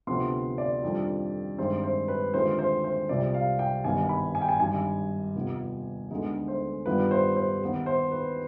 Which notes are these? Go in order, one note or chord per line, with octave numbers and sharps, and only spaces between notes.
D2 C3 F3 B3 C6
D5
F2 D#3 G3 D4 F4
G2 D#3 G#3 C4 D#4 C5
C5
B4
D#2 D3 G#3 C4 F4 C5
C5
C5
C2 C3 G3 C4 F4 D5
F5
G5
G#1 G2 D#3 G3 B3 G#5
B5
G#5
G5
G#5
G#1 G2 D#3 G#5
F1 D#2 D#3 B3 F4
D2 D3 G#3 B3 D#4
C5
G2 D#3 G3 B3 F4 B4
C5
C5
D#2 D#3 B3
C5
B4